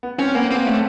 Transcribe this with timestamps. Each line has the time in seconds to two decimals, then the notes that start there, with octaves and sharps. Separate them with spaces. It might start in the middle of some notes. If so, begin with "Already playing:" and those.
0.03 B3
0.19 C4 C#4
0.35 A#3 B3
0.50 A#3 C4
0.66 A3 C#4